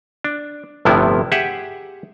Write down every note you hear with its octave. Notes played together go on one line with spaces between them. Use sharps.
D4
G1 A2 C3 F3 B3 E4
G4 G#4 E5 F#5